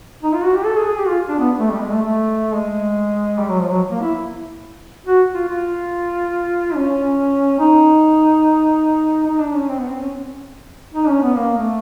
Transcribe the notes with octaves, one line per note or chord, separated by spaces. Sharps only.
D#4
F4
F#4
G4
A4
G#4
G#4
G4
F4
D4
B3
A3
G3
G#3
A3
A3
G#3
G3
F#3
F3
F#3
A#3
E4
F#4
F4
F4
C#4
D#4
D#4
D4
C#4
C4
B3
C4
C#4
D#4
C#4
B3
A#3
A3